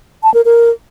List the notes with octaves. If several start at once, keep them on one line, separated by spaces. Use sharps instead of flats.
A5
A#4
A#4